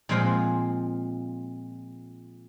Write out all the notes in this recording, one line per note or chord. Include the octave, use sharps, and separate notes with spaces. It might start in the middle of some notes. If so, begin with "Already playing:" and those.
A#2 F3 G#3 C4 C5 F#5